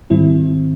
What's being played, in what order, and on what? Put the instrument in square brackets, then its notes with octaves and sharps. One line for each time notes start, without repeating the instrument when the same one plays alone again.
[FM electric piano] G#2 D#3 G3 C4 E4